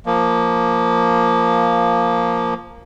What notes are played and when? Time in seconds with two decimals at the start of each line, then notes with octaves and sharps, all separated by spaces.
0.06 F3 A#3